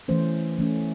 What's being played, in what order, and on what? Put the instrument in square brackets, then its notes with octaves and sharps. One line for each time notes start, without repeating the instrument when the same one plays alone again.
[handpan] E3 A3 C#4 C5
E3 A3 C#4